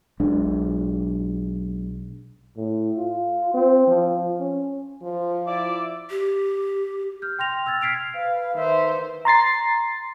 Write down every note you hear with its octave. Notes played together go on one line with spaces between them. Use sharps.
B1 G#3 D4
A2
F4
C4
F3
C#4
F3
E4 D5 D6
G4
F6 G6
G5 C6 A#6 F7
E6 F6 G#6 A6
F6 G#6 B6 C7 D7 F7
B4 F5
D#3 C5 E5
A#5 C6 A6 C7